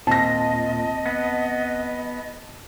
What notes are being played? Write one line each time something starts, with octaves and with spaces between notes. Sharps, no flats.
D#2 A#2 C4 D#5 A5 A#6
B3